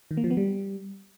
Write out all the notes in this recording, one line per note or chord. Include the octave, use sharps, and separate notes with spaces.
D#3
A#3
F3
B3
G3